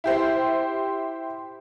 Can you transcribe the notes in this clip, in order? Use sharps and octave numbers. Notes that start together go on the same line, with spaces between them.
E4 G4 C5